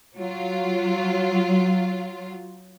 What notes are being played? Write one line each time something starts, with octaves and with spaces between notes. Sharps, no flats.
F#3 F4